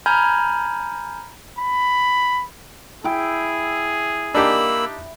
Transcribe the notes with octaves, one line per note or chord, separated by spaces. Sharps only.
G#5 A#5 B5 F6 G6 G#6
B5
E4 G#4 G5
A#3 D4 D#4 G4 B5 E6